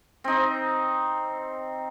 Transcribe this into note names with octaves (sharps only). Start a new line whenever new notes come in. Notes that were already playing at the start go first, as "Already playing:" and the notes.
C4 D#4